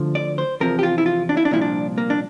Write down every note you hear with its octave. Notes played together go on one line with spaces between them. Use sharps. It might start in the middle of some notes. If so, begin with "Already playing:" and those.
Already playing: D2 D3 F3
D5
C5
E2 C3 F3 A#4
G4
F4
E4
F4
D4
E4
D4
C2 A#2 F3 E4
D4
A#3
D4